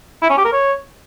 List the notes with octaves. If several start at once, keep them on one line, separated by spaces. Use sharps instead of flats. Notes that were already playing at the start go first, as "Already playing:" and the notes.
E4
C#4
G4
A#4
C#5